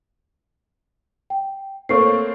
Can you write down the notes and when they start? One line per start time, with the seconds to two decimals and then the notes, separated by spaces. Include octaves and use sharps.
1.30 G5
1.89 A3 A#3 C4 C#5 C#6 C7